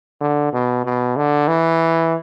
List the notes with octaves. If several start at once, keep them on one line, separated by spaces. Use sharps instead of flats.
D3
B2
B2
D3
E3